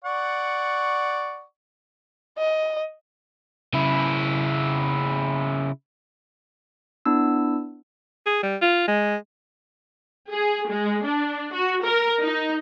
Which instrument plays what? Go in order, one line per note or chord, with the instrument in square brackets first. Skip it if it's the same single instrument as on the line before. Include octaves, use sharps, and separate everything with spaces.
[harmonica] D5 F#5 C#6
[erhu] D#5
[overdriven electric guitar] C#3 E4
[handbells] B3 D4 E4 E6
[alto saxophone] G#4
G3
F4
G#3
[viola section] G#4
G#3
D4
F#4
A#4
D#4